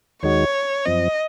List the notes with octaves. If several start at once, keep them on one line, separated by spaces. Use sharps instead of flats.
D#2 D#3 G#3 D#4 F#4 C#5
F#2 F3 C4 D#5